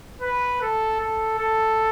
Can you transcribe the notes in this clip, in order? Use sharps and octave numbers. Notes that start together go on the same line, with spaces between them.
B4
A4
A4
A4